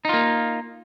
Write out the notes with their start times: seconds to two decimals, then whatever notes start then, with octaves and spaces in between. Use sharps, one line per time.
0.05 D#4
0.09 F4
0.13 A#3